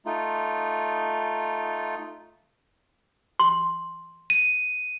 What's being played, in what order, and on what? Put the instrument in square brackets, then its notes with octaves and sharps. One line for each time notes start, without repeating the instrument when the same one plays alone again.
[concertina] A3 D#4 F4
[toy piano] C6
[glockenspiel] D#7